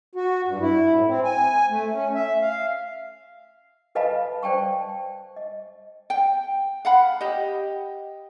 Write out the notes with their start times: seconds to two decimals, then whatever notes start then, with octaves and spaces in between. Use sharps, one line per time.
0.15 F#4
0.47 G2
0.60 E4
0.94 A2
1.08 C4
1.24 G#5
1.70 A3
1.92 C#4
2.15 E5
2.41 F5
3.95 A4 B4 D#5 F5 A5 B5
4.43 C5 D5 G5 A5 C#6
5.36 D#5
6.10 G5
6.85 F5 F#5 B5
7.21 G4 D#5